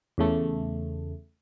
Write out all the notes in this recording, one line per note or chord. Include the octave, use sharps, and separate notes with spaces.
E2 C#3 A3